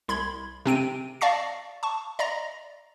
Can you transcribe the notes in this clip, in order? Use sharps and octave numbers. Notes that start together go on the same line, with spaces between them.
C2 B5 C6 G#6
C3 C4 D7 D#7
D5 F5 A5 C#6 A#6 C7
A5 C#6
D5 D#5 A#5 A#6